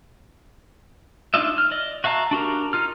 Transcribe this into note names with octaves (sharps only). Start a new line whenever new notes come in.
D4 D#4 F4 D#5 E5
F6
D5 D#5
F#4 E5 F5 A5 A#5
D4 F#4 G4 A#4
D#4 F4 F6